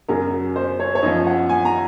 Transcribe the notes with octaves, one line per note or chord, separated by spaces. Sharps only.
F#2 C#3 F#3 A#4
C5
C#5
C#5
F#2 F3 D#5
F#5
G#5
A#5